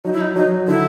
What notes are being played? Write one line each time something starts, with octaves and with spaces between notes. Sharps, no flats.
F#3 D#4
E4
D#4
F#3 D#4
D3 E4